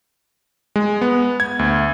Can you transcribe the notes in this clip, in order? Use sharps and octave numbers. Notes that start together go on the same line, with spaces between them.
G#3
B3
G#6
D2